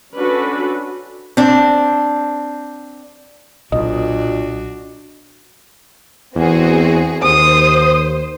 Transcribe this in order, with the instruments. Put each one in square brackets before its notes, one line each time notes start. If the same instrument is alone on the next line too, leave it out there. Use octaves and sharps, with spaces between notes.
[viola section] C#4 D4 F#4 A4 B4
[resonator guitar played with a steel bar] C4 D4
[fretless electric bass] B1 [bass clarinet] A#2 [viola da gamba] D4 F#4 [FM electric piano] D#5
[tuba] E2 [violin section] C4 F#4 G#4
[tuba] D#2 [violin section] C5 [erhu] D#6